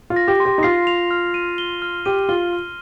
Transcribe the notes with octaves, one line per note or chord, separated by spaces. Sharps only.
F4
A#6
G4
C6
G4
D#4
F4 C7
F7
F6
D#7
G7
F6
G4 D#7
F4 G7
F6